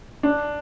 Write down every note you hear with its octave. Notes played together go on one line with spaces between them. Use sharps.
D4